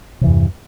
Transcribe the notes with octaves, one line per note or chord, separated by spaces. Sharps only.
E2 G2 C3 E3